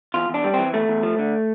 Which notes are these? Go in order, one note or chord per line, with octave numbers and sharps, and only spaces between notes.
E2 F4
E2 D4
G3
E3 C4
E2 A3
E2
F3
D3